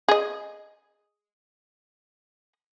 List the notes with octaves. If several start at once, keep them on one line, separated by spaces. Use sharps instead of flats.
G#4 D#5